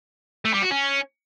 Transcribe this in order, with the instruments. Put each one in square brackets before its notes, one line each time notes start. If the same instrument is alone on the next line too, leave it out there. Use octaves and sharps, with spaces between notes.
[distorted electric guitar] A3
G3
F#4
C#4